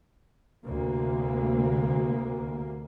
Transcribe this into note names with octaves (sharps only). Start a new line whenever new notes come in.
D2 C3 A#3